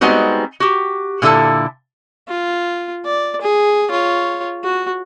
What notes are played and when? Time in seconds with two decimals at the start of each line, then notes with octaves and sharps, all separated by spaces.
0.01 G3 G#3 B3 C4 D#4 F#4
0.60 F#4 G4
1.22 A#2 D3 E4 A4 A5
2.28 F4
3.05 D5
3.42 G#4
3.91 F4 C#5
4.64 F#4